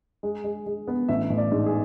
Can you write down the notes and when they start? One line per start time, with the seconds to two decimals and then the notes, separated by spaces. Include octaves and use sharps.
0.23 G#3
0.44 G#3
0.66 G#3
0.88 B3
1.09 A1 E5
1.30 A1
1.38 D5
1.52 G#2
1.66 G#4